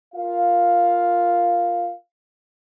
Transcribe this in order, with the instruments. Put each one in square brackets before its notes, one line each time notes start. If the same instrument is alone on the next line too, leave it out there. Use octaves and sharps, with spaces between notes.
[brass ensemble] F4 A#4 F5